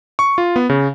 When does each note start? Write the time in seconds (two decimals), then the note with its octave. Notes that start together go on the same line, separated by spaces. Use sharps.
0.19 C#6
0.38 F4
0.56 B3
0.70 C#3